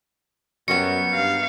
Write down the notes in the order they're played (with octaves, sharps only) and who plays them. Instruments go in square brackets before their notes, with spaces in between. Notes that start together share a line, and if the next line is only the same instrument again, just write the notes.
[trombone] F#2 [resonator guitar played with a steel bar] F#3 G3 B3 [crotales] C#7
[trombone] G2 [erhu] F5